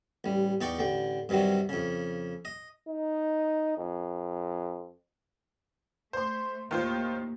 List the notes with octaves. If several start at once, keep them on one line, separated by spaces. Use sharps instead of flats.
A1 G3
E2 D#4 D5 G5 C#6
A1 D3 G5
G2 C3 D#3 F#3 G3
F2 C#3
D#5
D#4
F2
A3 C5 C6
D#2 A2 D#3 F4 C5